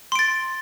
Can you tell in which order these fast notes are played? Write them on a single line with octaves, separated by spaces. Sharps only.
C6 D7 A6